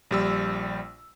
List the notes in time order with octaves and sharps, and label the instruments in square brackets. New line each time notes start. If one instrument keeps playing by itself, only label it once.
[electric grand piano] A#1 G3 E6